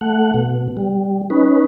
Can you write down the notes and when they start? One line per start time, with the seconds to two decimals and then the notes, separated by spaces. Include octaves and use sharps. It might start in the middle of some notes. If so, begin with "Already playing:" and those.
0.01 A3 F#5
0.34 B2
0.77 G3
1.30 C#4 D#4 B4